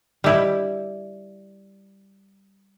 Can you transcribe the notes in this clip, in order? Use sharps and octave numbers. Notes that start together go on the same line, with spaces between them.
G3 E4 G4